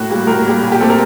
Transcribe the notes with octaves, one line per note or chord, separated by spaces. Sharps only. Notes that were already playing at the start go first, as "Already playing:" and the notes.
Already playing: A2 F#4
G3 A#3
A2 A#4
G3 A#3
A#2
G4
A3 C4 A4
A#4